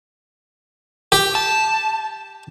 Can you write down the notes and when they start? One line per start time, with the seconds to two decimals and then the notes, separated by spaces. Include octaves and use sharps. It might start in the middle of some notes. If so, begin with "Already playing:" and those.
1.12 G4
1.35 A5